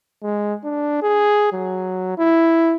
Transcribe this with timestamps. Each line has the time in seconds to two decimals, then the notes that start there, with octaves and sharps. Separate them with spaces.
0.23 G#3
0.64 D4
1.02 G#4
1.53 F#3
2.18 E4